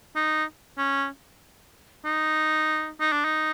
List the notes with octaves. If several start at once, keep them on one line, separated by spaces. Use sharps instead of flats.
D#4
C#4
D#4
D#4
D4
D#4